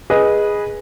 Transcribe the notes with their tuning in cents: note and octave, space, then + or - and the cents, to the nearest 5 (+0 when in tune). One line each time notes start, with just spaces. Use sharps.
G#4 -5 B4 -15 D#5 +0